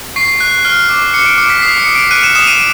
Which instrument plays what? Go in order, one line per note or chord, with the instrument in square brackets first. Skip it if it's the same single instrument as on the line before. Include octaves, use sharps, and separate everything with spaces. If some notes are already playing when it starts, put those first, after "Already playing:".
[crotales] C#6 C7
F#6
F6
D6
D6 C#7
D7
D6 C#7
B6
D#6 C7
C#7
D#6
D7
F#6 D#7
E7
D#6 E7
D#7